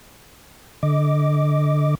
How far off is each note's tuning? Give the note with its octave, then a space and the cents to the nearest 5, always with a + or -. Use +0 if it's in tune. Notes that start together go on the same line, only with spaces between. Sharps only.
D3 +0 D#5 +5 D6 +0